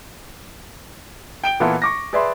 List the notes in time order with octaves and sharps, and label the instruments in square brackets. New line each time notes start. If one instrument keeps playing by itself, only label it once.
[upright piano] G5 D7 G7
A#2 E3 B3 E4 F4 A4
C#6 D6 A#6
G#4 B4 D5 E5 B5 C6